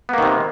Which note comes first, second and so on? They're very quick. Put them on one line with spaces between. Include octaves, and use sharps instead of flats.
B3 A#3 D#3 C3